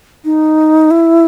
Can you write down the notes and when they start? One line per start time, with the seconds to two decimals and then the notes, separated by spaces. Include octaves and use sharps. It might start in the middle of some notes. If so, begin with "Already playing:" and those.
0.25 D#4
0.91 E4